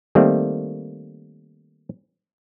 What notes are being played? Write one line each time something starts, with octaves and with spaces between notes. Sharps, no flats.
D#3 G3 A3 A#3 C4